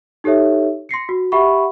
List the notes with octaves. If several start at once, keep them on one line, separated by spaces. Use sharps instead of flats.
D#4 G4 A4 C#5 E5
C6 A#6 C7 C#7
F#4
G4 E5 F#5 B5 C#6